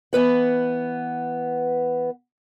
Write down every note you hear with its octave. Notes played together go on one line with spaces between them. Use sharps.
E3 B3 B4 F#5